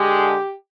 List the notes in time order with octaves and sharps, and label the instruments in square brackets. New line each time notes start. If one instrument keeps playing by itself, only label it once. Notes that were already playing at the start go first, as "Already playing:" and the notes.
Already playing: [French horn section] D3 G#3 G4